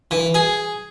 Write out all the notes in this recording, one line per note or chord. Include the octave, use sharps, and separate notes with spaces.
E3
G#4